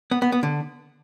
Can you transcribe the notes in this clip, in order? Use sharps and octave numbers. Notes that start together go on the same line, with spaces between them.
B3
B3
B3
D3